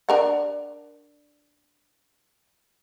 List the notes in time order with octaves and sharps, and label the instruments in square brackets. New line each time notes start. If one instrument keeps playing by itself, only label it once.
[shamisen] D4 A#4 F#5